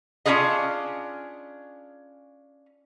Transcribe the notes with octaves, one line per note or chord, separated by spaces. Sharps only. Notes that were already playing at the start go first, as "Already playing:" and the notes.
C#4 D4 E4 F4 G#4 D#5